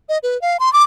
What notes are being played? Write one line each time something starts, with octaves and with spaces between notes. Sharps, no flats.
D#5
B4
F5
C6
D6